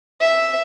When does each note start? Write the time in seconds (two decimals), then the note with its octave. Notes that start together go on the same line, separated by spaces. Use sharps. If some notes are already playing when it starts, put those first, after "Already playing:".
0.21 E5